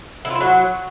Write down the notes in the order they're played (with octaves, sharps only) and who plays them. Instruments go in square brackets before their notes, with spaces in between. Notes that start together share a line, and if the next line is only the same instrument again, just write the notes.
[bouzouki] E4
F4
E4
F#3